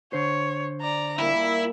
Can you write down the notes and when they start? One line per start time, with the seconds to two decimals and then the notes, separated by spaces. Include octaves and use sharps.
0.13 D3 C5 C#5
0.81 D5 A#5
1.19 A#2 G3 E4 E5